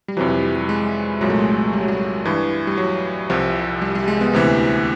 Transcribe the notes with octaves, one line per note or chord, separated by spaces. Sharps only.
G3
F2 C3 E3 F#3
G3
G3
G3
G#3
C2 A#2 F#3 G#3
A3
G#3
G3
F#3
G3
G2 E3
G3
F#3
C2 C3 F3
G3
G3
G#3
B3
D2 C3 E3